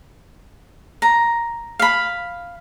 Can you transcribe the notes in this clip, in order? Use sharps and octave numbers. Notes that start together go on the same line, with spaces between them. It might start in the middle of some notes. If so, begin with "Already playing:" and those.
A#5
F5 B5